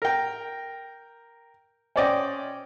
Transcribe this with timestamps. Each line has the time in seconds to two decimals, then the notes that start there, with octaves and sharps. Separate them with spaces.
0.02 A#4 G5
1.96 C#4 C5 D5 D#5 G5